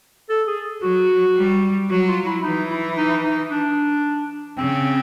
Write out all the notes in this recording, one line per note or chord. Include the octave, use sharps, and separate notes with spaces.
A4
G#4
F#3 F#4
G3
F#3 F#4
F4
E4
E3 D#4
E4
D#4
D#4
D4
C#3 C4